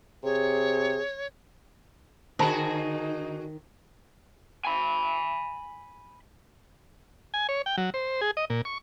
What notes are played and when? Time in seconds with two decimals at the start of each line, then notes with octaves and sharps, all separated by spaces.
0.24 C3 G#4 C#5
2.39 D3 D#3 D#4 F#4 G#4 C5 A5 B5
4.65 G#5 B5
7.34 G#5
7.49 C#5
7.66 G5
7.77 F#3
7.94 C5
8.21 G#4
8.37 D#5
8.50 A#2
8.65 C#6